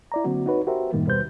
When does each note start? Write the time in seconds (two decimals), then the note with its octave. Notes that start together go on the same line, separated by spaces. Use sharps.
0.12 E4 D5 A#5
0.24 D3 F#3 A#3 C4 F#4
0.46 D#4 F#4 B4 C#5
0.67 F#4 G4 A#4 C5 E5
0.93 F#2 A2 D#3 G3 A#3
1.06 D#2 B2 G3 B4 C5 G6